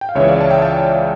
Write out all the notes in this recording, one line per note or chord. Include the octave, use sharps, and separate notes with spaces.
G5
F5
C#2 C#3 E3 C#5 E5
D5 F5
A5
G5
F5 A5